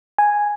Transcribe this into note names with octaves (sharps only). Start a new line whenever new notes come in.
G#5